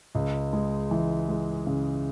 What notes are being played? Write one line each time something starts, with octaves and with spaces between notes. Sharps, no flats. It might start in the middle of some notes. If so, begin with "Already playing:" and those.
C#2
G#3
E3
G#3
C#3